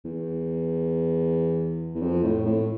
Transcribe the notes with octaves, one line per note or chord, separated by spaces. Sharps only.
E2
E2
F2
A2
A2